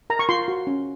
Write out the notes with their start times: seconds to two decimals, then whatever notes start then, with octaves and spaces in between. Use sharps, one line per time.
0.10 A#4 A#5
0.19 C#6
0.29 F4 C6
0.48 F#4
0.67 C#4